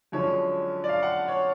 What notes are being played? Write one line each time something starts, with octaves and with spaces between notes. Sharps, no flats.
F#2 D3 F3 G#3 C#5
D5
F5
F#5
C#5